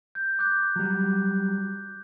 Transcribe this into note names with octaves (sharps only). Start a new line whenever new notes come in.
G6
D6 F#6 G6
F#3 G3